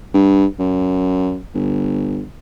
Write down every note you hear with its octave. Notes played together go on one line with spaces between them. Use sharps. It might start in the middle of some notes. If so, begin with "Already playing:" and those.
G2
F#2
G1